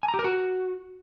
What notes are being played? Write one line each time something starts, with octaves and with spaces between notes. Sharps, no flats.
G#5
A#5
G4
A#4
F#4